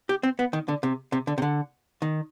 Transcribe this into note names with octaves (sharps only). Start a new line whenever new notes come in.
G4
C4
B3
D#3
D3
C3
C3
D3
C3
D3
D#3